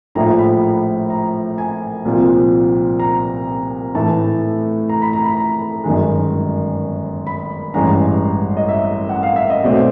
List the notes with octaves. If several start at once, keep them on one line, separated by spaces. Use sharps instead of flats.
A#1 A2 F3 A#5
B5
A#5
G#5
C2 A#2 F3
A#5
A2 E3 A3 A5
A#5
B5
A#5
B5
A#5
G1 F#2 D#3 G#3
B5
A1 G2 E3 G#3 A#5
D#5
E5
F#5
F5
E5
D#5
B1 B2 F#3 A3 C4 D5